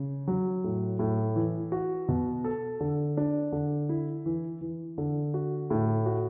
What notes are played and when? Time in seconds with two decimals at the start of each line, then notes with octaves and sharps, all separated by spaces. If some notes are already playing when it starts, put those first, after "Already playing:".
Already playing: C#3
0.27 F#3
0.64 A2
0.99 A2
1.36 E3
1.72 F#4
2.09 B2
2.44 A4
2.80 D3
3.17 D4
3.52 D3
3.89 E4
4.26 E3
4.61 E3
4.98 D3
5.34 F#4
5.70 A2
6.06 F#4